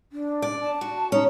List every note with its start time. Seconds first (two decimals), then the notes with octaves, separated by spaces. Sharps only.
0.12 D4
0.42 D5
0.61 A5
0.81 F#4
1.12 C#4 D#4